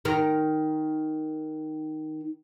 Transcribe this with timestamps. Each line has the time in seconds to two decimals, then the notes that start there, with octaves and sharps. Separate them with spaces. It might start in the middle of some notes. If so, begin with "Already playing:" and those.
0.05 D#3 A#4